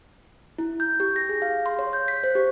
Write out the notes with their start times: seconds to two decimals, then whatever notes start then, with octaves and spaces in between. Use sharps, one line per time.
0.58 E4
0.80 G6
1.00 G4
1.16 A#6
1.29 G#4
1.42 F5
1.66 C6
1.79 C#5
1.93 G6
2.08 B6
2.24 C5
2.35 G4